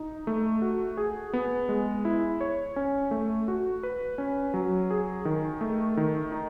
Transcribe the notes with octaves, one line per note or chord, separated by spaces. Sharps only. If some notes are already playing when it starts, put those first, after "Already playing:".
Already playing: D#4
A3
F#4
G#4
B3
G#3
E4
C#5
C#4
A3
F#4
B4
C#4
F#3
G#4
D#3
A3
D#3
D#4